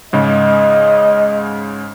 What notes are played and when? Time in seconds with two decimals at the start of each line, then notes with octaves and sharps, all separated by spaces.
0.13 G#2 C#3 G#3 D#5